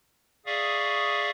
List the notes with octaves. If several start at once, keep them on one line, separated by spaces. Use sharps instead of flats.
G#4 D5 E5 F5 C#6 D#6